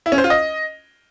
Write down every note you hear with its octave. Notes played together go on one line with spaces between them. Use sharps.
E4
C#4
C5
F4
D#5